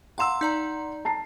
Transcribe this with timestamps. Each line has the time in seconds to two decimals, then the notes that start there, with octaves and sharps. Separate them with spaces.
0.18 F5 F#5 A#5 C6 E6 E7
0.41 D#4 D5 A#5
1.05 A5 A#5 C7